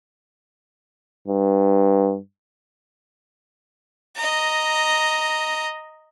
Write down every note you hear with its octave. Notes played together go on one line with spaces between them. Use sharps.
G2
D#5 A#5